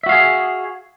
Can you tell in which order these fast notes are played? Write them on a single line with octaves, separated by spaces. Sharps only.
E5 F#4 F5 G#4